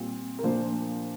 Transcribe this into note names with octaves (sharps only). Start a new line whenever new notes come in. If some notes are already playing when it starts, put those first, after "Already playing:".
Already playing: A#2 G3 C4
A#4
A#2 F3 A#3 D4 C5